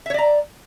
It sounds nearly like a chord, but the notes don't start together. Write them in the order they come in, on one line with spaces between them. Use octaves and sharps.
E5 C#5 D5 A#5